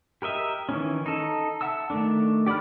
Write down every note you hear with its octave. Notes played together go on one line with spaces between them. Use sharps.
G4 A#4 D#5 E5
D#3 E3 C#4
D#4 A4
E5 F#5 A5 E6
D#3 A3 D4
G4 D5 F#5 B5 F6